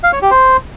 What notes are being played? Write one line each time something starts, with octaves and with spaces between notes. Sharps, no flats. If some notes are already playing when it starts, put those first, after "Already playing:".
F5
C#5
G4
C5